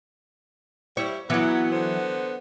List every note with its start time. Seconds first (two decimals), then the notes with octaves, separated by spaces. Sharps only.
0.97 G3 E4 C#5
1.30 E3 F#3 B3
1.72 D3 B3 C5